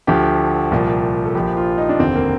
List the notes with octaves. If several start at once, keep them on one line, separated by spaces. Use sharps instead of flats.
D2 D3 F3 G4
C2 A#2 F3
A4
A#1 A#2 F3 G4
F4
D#4
D4
F1 D#2 D3 C4
A#3